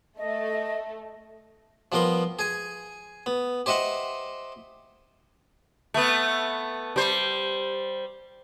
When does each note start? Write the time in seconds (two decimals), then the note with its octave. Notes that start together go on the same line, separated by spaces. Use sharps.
0.18 A3 D#5
1.92 F3 G3 B3 A#4 C6
2.39 G#4 G#5
3.26 B3
3.66 G4 C5 D#5 E5 F#5
5.94 A3 B3
6.96 G3 C5